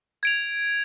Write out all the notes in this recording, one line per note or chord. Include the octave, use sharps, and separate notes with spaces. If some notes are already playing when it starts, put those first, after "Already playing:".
G#6 D7 F7